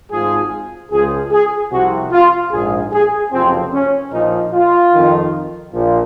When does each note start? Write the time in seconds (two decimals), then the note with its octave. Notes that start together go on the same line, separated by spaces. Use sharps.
0.11 G#1 G#2 F3 G#4
0.91 C#2 C#3 F3 G#4
1.32 G#4
1.71 C2 C3 F3 F#4
2.12 F4
2.52 A#1 G#2 F3 G#4
2.92 G#4
3.32 F#1 F2 C3 F3 C4
3.72 C#4
4.12 A#1 A#2 F3 D#4
4.52 F4
4.93 F2 D#3
5.73 A#1 A#2 F3